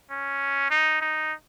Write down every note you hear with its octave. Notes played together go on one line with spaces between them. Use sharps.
C#4
D#4
D#4